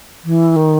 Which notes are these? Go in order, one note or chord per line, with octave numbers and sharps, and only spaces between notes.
E3
D#3